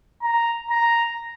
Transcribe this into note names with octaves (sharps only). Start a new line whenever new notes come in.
A#5
A#5